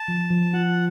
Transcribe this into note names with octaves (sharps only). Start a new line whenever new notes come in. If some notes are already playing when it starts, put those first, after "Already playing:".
Already playing: A5
F3
F3
F4 F#5